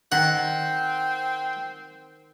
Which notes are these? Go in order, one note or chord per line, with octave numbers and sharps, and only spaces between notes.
D#3 C4 F#5